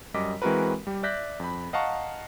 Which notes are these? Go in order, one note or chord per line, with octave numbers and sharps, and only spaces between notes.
F#2 G3 D#5 D6 B6
E3 G#3 C4 F#4 A#4 B4
G3 G4
D5 E5 F#6 G6 A#6 B6
F2 B5
D#5 F5 F#5 A5 A#5 C#6